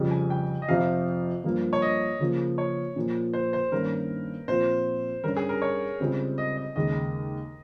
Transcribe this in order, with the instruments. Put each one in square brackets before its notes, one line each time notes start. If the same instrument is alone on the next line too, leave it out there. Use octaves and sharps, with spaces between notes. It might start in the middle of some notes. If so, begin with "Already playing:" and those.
Already playing: [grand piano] F2 C#3 G3
[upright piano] G#5
G5
D#5
[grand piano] F2 C3 F3 [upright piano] F5
[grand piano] G2 F3 A#3
[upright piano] C#5
D#5
[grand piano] C#3 F3 A#3
[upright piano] C#5
[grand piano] A#2 F3 A#3
[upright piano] C5
C5
[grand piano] G2 D#3 A#3 C#4 [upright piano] A#4
[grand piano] A#2 F3 C4 F4 [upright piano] C5
[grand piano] G2 G3 C#4 [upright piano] A#4
[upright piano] G#4
A#4
C#5
[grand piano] C#2 C#3 G3 C4
[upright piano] D#5
D#5
[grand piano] D#2 C#3 G#3 [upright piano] D#5